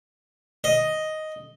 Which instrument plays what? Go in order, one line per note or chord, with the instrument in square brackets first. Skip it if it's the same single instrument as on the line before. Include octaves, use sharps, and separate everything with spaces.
[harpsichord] D#5